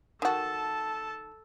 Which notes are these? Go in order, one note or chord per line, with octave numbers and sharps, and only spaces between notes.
D#3 F#4 A4 A5